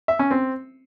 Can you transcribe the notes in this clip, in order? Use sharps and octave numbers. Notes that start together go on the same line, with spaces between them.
E5
C#4
C4